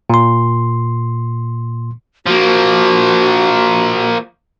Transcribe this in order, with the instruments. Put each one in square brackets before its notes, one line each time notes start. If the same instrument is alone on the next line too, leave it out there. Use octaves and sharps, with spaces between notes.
[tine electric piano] A#2 C6
[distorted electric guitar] F3 A#3 [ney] F#4